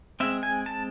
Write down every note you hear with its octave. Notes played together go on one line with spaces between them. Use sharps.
G#3 C4 E5
G#5
A5